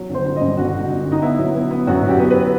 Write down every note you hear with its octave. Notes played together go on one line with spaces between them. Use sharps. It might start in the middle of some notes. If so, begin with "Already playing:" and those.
Already playing: F#3
G1 C5
G1
D#5
G2
G1 F#4
G1
G1
G1
D#4
B3 E4
F#3
B3
B3
F#2 F#4
F#2
G4
B3
B4